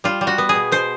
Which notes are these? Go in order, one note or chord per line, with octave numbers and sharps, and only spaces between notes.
G3 F4
G3
F#4
B3
G#4
B2
B2 C5